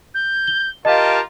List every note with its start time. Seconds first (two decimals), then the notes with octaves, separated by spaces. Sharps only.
0.14 G6
0.47 G7
0.85 F4 G4 A#4 D#5 F5 A5